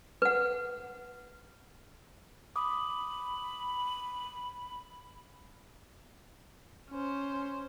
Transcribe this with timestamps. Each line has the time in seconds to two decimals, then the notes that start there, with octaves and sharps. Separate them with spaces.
0.22 B4 F#5
2.56 B5 D6 D#6
6.90 C#4 C5